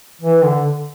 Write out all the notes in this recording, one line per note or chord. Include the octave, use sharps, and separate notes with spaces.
E3
D3